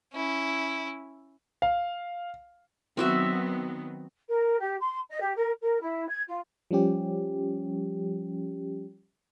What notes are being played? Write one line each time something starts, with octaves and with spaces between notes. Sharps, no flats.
C#4 E4
F5
D#3 F#3 B3 C4 F#4 E5
A#4
G4
C6
D#5
G4
A#4
A#4
E4
G#6
F4
F3 G3 C#4 G4